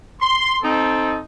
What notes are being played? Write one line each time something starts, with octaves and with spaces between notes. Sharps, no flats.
C6
C4 D#4 A4